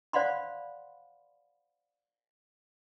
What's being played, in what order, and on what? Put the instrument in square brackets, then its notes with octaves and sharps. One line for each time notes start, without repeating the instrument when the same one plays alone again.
[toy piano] C5 D5 F5 F#5 B5 C6